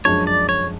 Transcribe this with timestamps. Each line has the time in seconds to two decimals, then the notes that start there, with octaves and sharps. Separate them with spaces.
0.05 F#2 F3 G#3 D4 G#4 C#5
0.27 D5
0.49 C#5